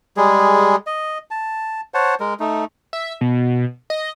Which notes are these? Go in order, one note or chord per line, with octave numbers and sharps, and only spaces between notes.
G3 G#3 G#4
D#5
A5
C5 C#5 F#5 A5
G#3 A#4
A3 D#4
E5
B2
D#5